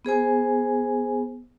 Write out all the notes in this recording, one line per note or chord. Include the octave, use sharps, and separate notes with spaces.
B3 G#4 C5 G#5